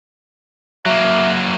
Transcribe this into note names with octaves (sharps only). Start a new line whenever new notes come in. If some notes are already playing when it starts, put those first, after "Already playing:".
F#3 A#3 E5